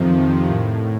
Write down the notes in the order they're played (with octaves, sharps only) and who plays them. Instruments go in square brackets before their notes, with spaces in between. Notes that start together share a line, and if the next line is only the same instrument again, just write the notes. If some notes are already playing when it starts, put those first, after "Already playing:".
Already playing: [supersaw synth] F2 C3 D#3 F3
A2